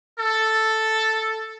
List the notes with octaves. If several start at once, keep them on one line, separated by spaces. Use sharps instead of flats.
A4